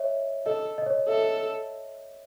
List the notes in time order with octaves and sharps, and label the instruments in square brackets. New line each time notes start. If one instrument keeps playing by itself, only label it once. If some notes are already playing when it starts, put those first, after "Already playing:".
Already playing: [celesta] C#5 D#5 E5
[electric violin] A4 [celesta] D#5
[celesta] D#5
C#5
D#5
[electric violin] A4 [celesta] E5